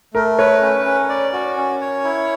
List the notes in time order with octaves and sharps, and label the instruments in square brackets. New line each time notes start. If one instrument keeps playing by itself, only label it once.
[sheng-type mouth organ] A3 [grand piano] A#4
[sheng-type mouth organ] B4 [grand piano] C#5
[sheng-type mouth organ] C#4
C#4
D5
F#4
C#4
C#5
E4